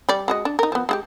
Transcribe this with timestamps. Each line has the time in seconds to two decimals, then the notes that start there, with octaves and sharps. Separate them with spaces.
0.09 G3 D5
0.28 G#3 F#4 D#5
0.45 D4
0.59 D#4 A#4
0.72 F3 B3
0.89 G#3 F#4 G4